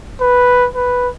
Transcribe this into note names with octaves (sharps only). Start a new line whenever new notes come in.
B4
B4